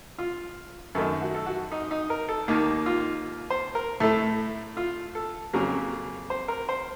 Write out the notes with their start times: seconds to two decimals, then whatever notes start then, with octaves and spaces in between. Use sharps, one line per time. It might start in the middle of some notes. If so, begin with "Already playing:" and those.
0.19 F4
0.95 F#2 D#3 A3 A4
1.21 F#4
1.35 A4
1.46 F#4
1.72 D#4
1.91 D#4
2.10 A#4
2.29 A4
2.48 D#2 D#3 A#3
2.86 F4
3.50 C5
3.75 A#4
4.00 A2 A3 A4
4.77 F4
5.15 A4
5.53 F2 C#3 F#3 A#3 A#4
6.30 C5
6.48 A#4
6.69 C5